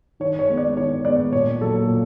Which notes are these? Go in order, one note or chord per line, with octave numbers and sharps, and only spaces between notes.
D#3 C#5
C#5
G#3 B3
D5
D#3 C#5
G#3 B3 D5
A#2 C#5
F#3 A#3 A4
A#2